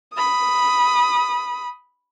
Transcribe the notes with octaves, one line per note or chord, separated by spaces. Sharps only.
B5 D#6